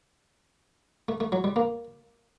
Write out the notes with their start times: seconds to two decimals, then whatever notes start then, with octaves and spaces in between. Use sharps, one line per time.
1.09 A3
1.20 A3
1.32 F#3
1.44 G3
1.56 A#3